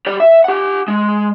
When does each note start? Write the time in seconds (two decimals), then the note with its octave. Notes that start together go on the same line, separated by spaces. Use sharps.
0.07 G4 D5
0.20 E5
0.44 G4 F#5
0.88 G#3